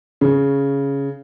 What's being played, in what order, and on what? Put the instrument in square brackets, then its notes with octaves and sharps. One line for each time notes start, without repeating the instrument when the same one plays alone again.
[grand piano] C#3